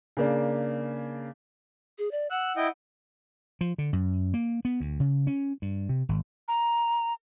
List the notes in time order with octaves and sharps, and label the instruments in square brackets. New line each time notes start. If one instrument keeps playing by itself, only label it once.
[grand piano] C#3 A#3 D4
[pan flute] G#4
D5
[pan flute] F#5 [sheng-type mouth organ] E6 F#6
[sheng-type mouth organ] E4 D#5 G5
[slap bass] F3
D3
F#2
A#3
B3
D2
C#3
C#4
G2
C3
G#1
[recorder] A#5